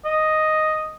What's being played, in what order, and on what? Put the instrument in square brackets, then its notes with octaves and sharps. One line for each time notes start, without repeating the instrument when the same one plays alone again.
[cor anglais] D#5